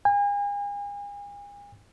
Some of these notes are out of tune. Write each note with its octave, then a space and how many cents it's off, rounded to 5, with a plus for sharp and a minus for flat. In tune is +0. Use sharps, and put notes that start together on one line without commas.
G#5 -40